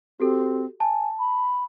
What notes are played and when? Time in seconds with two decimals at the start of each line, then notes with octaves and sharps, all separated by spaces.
0.20 C4 F#4 G4 A4
0.80 G#5 A5
1.19 B5